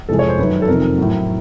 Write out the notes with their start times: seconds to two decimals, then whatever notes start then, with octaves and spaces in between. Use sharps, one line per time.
0.09 F2 C3 E3 G#3 A4
0.19 C#5
0.29 C5
0.39 F#2 D#3 F#3 B4
0.62 A4
0.68 F2 C3 D#3 A#4
0.98 A2 F#3